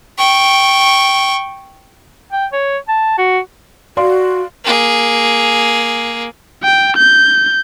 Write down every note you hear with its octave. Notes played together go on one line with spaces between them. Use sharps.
G5 C#6
G5
C#5
A5
F#4
F#4 D5 F5 C6
A#3 G#4
G5
G6